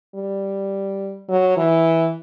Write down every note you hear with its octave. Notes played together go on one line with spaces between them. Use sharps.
G3
F#3
E3